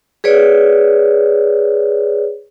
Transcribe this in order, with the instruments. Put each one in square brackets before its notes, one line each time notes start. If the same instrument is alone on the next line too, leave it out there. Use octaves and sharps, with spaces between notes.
[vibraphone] G#4 B4 C#5 D5